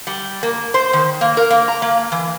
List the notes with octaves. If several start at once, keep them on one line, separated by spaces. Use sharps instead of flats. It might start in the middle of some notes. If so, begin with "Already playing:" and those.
G3
A#3
C5
D#3
A#3
A#4
A#3
A#5
A#3
E3